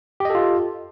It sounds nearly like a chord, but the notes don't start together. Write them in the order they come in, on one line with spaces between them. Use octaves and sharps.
G4 D#5 A4 F4